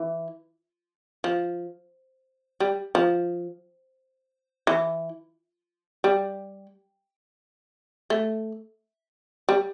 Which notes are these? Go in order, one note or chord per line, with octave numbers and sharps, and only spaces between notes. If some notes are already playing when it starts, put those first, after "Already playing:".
Already playing: E3
F3
G3
F3
E3
G3
A3
G3